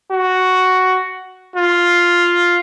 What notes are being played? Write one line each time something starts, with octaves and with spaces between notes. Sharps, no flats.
F#4
F4